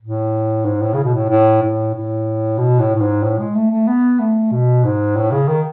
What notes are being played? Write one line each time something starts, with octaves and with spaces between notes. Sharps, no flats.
A2
G#2
A2
C#3
B2
A2
A2
A2
A2
B2
A2
A2
G#2
A2
G#3
A3
A3
B3
A3
B2
G#2
A2
C#3
D#3